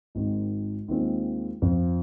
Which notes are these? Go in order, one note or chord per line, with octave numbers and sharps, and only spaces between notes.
G#1 G#2 D#3 C4
D#2 D#3 G#3 C4 F4
F2 F3 C4 F4